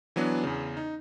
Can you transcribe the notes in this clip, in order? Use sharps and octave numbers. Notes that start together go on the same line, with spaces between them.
E3 F#3 B3 D4
E2 C#3
D#4